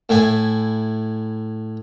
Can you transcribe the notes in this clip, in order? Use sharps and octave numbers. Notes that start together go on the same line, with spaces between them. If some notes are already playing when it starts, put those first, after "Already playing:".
A2 E4 E5 G#5